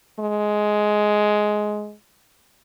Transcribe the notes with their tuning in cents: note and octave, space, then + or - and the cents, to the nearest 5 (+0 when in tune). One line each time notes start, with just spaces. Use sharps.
G#3 +10